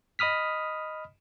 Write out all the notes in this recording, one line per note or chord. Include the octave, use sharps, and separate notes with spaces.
D#5 B5 D#6 F6 B6